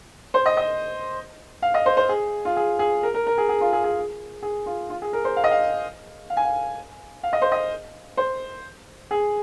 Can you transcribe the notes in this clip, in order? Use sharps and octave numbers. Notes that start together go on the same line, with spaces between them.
C5
D#5
D#5
F5
D#5
C5
C5
G#4
F4
G#4
G#4
A#4
A#4
A#4
G#4
G#4
F4
G#4
G#4
G#4
F4
F4
G#4
A#4
C5
F5
D#5
F5
F5
G#5
F5
F5
D#5
C5
D#5
C5
G#4